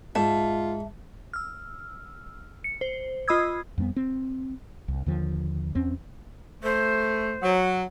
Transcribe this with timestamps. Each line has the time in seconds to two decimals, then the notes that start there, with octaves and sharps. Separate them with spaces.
0.15 G#2 F4 E5 A5
1.33 E6 F6
2.64 C#7
2.81 C5
3.28 F4 D#5 B5 D#6 E6 G#6
3.78 F2 G3 A#3 B3
3.96 C4
4.88 C2
5.06 D#2 D3 F3
5.75 E2 C4 C#4
6.63 A3 C5
7.42 F#3